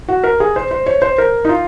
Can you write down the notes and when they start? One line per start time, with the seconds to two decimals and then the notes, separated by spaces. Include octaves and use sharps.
0.08 F#4
0.24 A#4
0.40 G#4
0.56 C5
0.71 C5
0.86 C#5
1.02 C5
1.18 A#4
1.45 D#4
1.49 F4